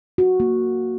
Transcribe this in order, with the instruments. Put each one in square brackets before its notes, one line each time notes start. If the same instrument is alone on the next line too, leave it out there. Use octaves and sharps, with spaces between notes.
[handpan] F#4
A#3